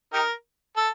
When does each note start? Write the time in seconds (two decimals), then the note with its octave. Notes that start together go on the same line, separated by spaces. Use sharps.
0.13 D#4 G4 A#4
0.77 A4